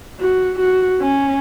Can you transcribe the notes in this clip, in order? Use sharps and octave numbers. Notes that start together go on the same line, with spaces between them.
F#4
F#4
C#4